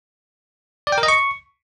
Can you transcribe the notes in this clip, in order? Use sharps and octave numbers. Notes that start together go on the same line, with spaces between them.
D5
G5
A#4
D#5
C#6